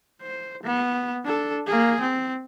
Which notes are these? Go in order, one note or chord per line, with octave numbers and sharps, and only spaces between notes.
C5
B3
D4 A4
A#3 G#4
C4